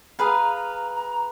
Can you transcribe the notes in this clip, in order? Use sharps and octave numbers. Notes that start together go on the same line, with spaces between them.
G#4 B4 F5 A#5
A#5